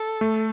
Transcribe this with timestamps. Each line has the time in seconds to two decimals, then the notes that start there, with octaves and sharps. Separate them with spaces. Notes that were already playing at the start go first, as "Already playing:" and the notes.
Already playing: A4
0.21 A3